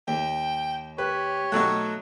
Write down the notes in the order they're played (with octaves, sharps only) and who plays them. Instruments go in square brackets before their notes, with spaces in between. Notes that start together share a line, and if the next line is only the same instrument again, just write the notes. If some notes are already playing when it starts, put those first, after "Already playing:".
[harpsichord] D#2 [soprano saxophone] G5
[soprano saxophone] G4 [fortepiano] B4 [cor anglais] C#5
[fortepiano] B2 F#3 F#6 [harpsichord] A3 D#4